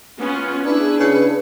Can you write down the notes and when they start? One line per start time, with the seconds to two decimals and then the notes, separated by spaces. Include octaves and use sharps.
0.20 B3 C#4 F4
0.64 D4 E4 G#4 B4
1.00 C#3